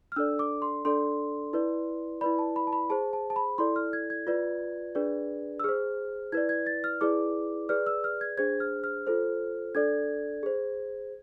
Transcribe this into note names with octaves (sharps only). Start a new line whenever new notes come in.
F6
D4 A4 D5 E6
D6
C6
D4 A4 D5 C6
E4 B4 D5
E4 B4 D5 B5
A5
B5
A5
B5
G#4 C5 A5
A5
A5
B5
E4 A4 D5 C6
F6
G#6
G#6
F4 B4 D5
D4 G#4 B4 D5
E6
G#4 C5 F6
E4 B4 D5 G#6
G#6
A6
F6
E4 G#4 B4 D5 D6
G#4 B4 D5 F6
E6
F6
G#6
D4 G#4 C5 G#6
F6
F6
F4 A4 C5
D4 A4 D5 G#6
G#4 C5